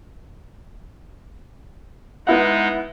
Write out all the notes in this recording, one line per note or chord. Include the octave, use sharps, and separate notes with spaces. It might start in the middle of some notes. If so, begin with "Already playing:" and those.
G#3 B3 D#4 E4 F#5